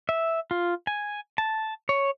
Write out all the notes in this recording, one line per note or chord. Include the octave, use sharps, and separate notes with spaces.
E5
F4
G#5
A5
C#5